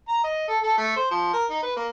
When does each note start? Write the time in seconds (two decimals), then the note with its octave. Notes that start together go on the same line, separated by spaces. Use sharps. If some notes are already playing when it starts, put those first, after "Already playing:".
0.09 A#5
0.24 D#5
0.48 A4
0.63 A4
0.78 A3
0.96 C5
1.11 F3
1.33 A#4
1.50 D#4
1.63 B4
1.77 A#3